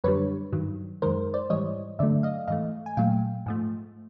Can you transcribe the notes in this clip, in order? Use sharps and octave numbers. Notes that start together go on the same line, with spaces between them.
F#2 D3 G3 B4 C#5
G2 D#3 F#3
F#2 D#3 G#3 A#4 C5
C5 D5
G#2 E3 G3 C#5 D#5
G2 D3 F#3 A3 D5 E5
D#5 F5
G#2 E3 A3 D#5 F5
G#5
A#2 F#3 A3 F5 G5
G#2 F3 A3